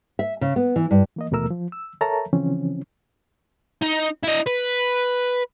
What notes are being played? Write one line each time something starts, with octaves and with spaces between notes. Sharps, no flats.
E5
C#3
B3
E3
G2
E3 A#3 D#5
D#2 B2 E3 A3 A#4 E6
F3
E6
A4 A#4 C#5 E5 A5 A#5
C#3 E3 F3 C4 C#4
D#4
E4 D#5
B4